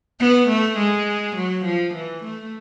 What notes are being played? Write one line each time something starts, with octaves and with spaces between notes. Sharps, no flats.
B3
A3
G#3
F#3
F3
E3
A3